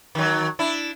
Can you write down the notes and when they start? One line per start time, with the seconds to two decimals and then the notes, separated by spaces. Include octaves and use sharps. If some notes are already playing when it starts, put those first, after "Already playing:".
0.15 D#3 F#3
0.59 D4 E4